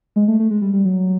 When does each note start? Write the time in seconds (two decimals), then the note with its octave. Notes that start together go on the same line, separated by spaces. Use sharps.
0.16 G#3
0.28 A3
0.39 A3
0.51 G#3
0.62 G3
0.73 G3
0.85 F#3